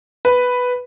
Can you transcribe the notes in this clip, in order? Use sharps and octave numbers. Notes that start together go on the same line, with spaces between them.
B4